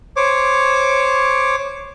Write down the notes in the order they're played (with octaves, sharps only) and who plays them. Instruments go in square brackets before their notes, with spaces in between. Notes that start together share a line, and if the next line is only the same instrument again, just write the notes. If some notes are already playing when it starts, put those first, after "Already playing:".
[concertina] C5 C#5 D6